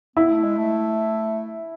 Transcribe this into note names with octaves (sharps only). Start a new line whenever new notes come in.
B3 E4
A3
G#3
A3